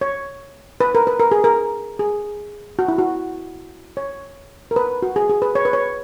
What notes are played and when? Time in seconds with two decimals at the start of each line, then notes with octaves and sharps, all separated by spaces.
0.01 C#5
0.80 B4
0.95 A#4
1.07 B4
1.19 A#4
1.32 G#4
1.44 A#4
1.99 G#4
2.79 F#4
2.88 E4
2.98 F#4
3.97 C#5
4.71 A#4
4.76 B4
5.02 F#4
5.16 G#4
5.30 G#4
5.42 B4
5.55 C#5
5.65 B4
5.73 C#5